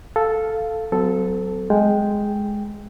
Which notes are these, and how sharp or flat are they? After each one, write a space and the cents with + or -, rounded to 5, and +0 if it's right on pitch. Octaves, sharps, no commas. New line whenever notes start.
A4 +0 F5 +0
F#3 +10 C4 -40 A4 +0
G#3 +0 G5 +0